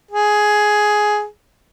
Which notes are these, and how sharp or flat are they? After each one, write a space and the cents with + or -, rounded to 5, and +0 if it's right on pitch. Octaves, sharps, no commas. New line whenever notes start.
G#4 +10